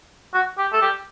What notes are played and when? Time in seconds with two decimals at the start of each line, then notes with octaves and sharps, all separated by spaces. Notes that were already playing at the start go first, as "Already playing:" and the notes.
0.34 F#4
0.58 G4
0.73 A4
0.81 G4